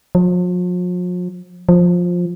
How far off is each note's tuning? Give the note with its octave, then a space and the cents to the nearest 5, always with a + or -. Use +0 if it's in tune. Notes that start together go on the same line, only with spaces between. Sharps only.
F3 +45
F3 +15